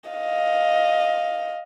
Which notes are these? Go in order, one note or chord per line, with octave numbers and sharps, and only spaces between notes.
D#5 F5